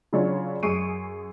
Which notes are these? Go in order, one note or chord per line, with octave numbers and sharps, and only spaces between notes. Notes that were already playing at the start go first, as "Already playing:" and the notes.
C#3 F#3 C#4 D4 F4 C#5
F#2 G#4 C#6 C7 D7 D#7